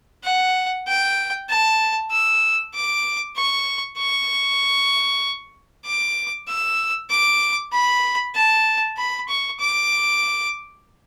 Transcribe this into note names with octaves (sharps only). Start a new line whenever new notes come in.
F#5
G5
A5
E6
D6
C#6
C#6
D6
E6
D6
B5
A5
B5
C#6
D6